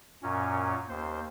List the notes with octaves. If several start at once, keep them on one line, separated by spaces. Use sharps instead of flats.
F#2 A#2 C#4
D#2 C5